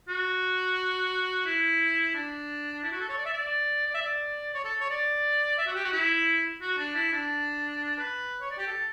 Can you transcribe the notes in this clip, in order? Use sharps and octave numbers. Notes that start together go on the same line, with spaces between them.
F#4
E4
D4
E4
F#4
A4
C#5
D5
E5
D5
D5
E5
D5
C#5
A4
C#5
D5
E5
F#4
G4
F#4
E4
F#4
D4
E4
D4
B4
C#5
D5
G4
A4